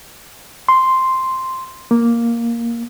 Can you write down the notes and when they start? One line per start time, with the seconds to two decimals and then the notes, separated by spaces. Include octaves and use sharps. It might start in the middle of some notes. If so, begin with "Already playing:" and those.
0.69 C6
1.91 A#3